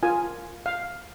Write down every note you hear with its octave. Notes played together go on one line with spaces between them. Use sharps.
F4 A#4 G#5
F5